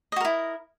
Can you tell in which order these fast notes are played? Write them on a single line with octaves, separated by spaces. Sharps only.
D#5 F#4 A#4 E4